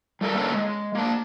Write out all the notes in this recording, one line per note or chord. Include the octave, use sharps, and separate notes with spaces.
G3 A3 A4 A#4
A#3 C#4 D4 A4 B4
G#3
A#3 D4